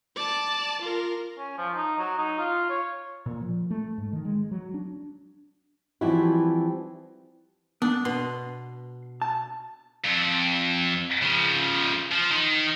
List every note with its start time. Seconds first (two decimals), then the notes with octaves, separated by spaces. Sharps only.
0.16 D5 A5
0.82 F4 A#4
1.38 C#4
1.58 F3
1.75 D#4
1.98 F#3
2.17 D#4
2.39 F4
2.69 C#5
3.26 A#2
3.41 F3
3.70 A3
3.98 G#2
4.13 D#3
4.25 G#3
4.51 F#3
4.74 D4
6.01 E3 F3 G3 C4 E4 F#4
7.82 B3 D4
8.05 B2 C6
9.22 A5
10.05 F2
11.22 C#3 F3
12.11 F3
12.31 D#3